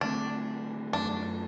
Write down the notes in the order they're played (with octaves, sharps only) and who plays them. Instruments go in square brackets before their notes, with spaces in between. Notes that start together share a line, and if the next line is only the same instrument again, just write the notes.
[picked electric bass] D3 A3 C4 [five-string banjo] D4
[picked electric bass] F#2 F#3 A3 [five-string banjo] D4